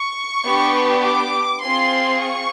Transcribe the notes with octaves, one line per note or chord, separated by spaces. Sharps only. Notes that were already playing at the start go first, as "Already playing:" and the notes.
Already playing: C#6
B3 D4 G4
D6
C4 F4 G#4 C6
C#6